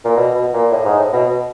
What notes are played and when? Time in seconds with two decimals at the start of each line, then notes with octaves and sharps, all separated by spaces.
0.05 A#2
0.17 B2
0.35 B2
0.53 A#2
0.72 A2
0.85 G#2
0.99 A2
1.13 B2
1.27 B2